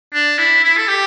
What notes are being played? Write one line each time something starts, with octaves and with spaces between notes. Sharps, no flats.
D4
E4
E4
A4
G4